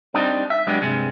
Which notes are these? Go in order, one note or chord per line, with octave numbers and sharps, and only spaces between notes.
G3 C4 D4 D#4 G4
E5
F#3 G#3 B3 D4 G4
G2 C3 G#3